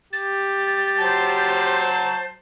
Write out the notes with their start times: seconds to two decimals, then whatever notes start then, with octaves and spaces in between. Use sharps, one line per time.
0.13 G4 A6
0.99 F#3 C5 A5 G6